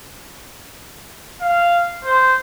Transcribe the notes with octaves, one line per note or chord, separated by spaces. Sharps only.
F5
C5